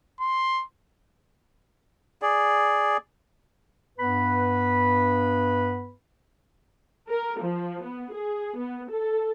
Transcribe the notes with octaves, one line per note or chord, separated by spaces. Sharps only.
C6
G#4 D5
G2 B3 B4 B5
A#4
F3
B3
G#4
B3
A4